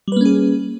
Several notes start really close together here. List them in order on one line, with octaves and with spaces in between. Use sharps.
G3 B4 A#3 C#4 G#4